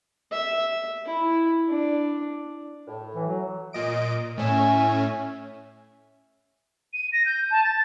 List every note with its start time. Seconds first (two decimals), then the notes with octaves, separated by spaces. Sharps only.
0.31 E5
1.05 E4
1.69 D4
2.87 A2
3.15 E3
3.26 F#3
3.73 A#2 D#5 D7
4.38 A2 C#4 E5 G#5
6.94 D#7
7.13 A#6
7.26 G6
7.51 A5
7.64 A6